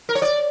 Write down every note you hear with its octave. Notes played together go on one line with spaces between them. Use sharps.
A#4
C#5
D5